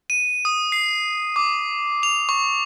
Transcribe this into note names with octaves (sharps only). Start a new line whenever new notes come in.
D#7
D#6
C7
D6
F7
C#6